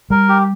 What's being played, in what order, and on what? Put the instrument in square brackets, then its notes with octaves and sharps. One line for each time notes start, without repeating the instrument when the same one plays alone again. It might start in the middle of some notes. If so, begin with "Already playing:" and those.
[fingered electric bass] G3 [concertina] A#4
[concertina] G4